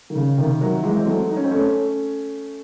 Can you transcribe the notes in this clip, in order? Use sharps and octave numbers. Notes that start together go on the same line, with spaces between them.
D#3
C#3
C3 D#3
D#3 F#3
E3 G#3
C4
F#3 A3
D#4
C#4
C4
A3 C#4